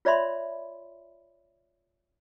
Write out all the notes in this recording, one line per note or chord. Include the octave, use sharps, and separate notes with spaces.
F4 C#5 D5 E5 B5 C6